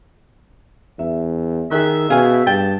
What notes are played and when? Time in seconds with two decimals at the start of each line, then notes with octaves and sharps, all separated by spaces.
0.99 E2 E5
1.71 D#3 G#4 E5 F#6
2.10 B2 C#4 G#4 F5 G#5
2.47 G2 G5 A5